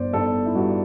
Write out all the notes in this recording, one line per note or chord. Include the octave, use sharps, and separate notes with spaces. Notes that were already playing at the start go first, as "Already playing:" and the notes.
Already playing: G1 C5 D5
G1 A4
E4
G2 F#4